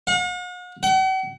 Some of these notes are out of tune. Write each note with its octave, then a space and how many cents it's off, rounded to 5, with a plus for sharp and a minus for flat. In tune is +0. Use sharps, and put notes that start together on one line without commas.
F#5 -45
F#5 +45